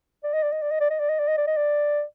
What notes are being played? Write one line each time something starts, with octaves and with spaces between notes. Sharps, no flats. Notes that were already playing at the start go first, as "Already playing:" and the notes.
D5
D#5
D5
D#5
D5
D#5
D5
D#5
D5
D#5
D5
D#5
D5
D#5
D5